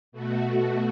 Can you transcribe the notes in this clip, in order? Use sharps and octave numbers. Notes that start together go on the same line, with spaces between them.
B2 A3 F#4